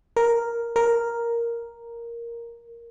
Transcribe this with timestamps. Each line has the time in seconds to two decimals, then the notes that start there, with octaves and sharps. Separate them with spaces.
0.17 A#4
0.76 A#4